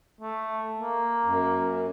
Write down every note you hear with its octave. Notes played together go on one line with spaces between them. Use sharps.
A3
A#3
F#2